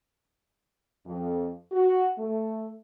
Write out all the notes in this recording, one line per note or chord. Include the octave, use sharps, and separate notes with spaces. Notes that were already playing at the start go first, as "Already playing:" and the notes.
F2
F#4
A3